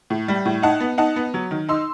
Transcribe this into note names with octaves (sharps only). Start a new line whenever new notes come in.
A2
G3
A2
D#4 F#5 A5
B3
D#4 F#5 A5
B3
F#3
D#3
D#4 C6 E6